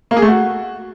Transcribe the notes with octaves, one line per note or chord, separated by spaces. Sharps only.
A#3
G#4
A3
F#4